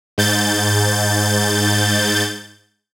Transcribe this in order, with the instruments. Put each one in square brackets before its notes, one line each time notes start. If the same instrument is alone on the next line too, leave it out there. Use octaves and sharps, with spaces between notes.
[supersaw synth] G#2 G6 A6